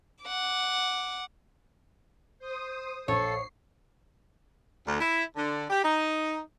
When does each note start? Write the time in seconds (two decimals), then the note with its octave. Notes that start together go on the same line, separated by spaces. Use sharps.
0.24 F#5 D6
2.39 C5 D#6
3.08 A#1 A4 C#5 C7
4.86 D2
5.01 E4
5.36 D3
5.69 G4
5.84 D#4